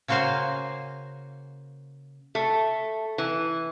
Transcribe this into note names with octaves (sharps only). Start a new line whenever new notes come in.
C#3 A#3 F#4 C5 F5 G#5
A3
E3